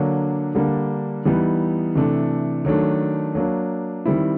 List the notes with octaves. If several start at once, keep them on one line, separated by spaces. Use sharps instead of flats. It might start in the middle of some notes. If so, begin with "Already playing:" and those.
Already playing: D3 F#3 A#3 D4
D3 G3 A#3 D4
E3 G3 B3 D#4
C3 E3 A3 D4
D#3 F#3 A3 D4
F#3 A#3 D4
D#3 G3 C4 E4